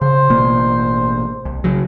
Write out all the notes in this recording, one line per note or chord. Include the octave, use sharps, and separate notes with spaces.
C#3 C5
A1 B2 A#3
C2
C#3 F#3